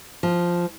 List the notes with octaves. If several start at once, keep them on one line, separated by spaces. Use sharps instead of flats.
F3